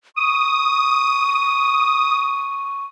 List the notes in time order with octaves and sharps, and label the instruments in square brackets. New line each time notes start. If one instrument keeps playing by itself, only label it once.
[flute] C#6 [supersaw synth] D#6